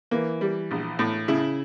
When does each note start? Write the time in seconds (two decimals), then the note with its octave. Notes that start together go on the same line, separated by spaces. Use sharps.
0.11 E3 A#3
0.41 G3
0.71 A#1
0.99 A2
1.28 C#3 E4